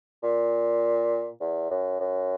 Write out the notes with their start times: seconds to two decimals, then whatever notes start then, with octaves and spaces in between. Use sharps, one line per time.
0.23 A#2
1.40 E2
1.71 F#2
2.00 F#2